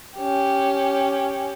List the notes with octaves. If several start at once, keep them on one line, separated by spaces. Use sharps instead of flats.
C#4 G4